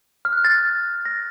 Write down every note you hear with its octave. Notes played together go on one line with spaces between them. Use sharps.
F6
F#6
A6
A#6